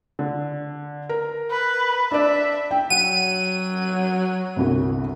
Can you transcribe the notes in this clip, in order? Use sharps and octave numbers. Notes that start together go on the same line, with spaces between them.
D3
A#4
B4
D4 D5 E5
G5
F#3 F#5 D#7
G1 C2 F#4